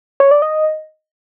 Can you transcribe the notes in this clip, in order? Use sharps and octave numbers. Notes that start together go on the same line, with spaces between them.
C#5
D5
D#5